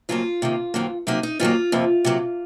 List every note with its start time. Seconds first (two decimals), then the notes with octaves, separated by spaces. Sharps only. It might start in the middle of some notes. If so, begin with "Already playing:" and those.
0.09 F2 C#3 F#3 A#3 F4
0.42 C3 D#3 A#3
0.74 F2 D#3 F#3 A#3
1.07 C3 F#3 A#3 D#4
1.23 D#4
1.39 G#2 D#3 F#3 A#3 F4
1.72 F2 C3 F3 A#3
2.05 C3 F#3 A#3